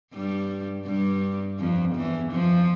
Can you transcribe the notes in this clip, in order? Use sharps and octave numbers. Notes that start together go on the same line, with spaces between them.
G2 G3
G2 G3
F2 F3
E2 E3
F2 F3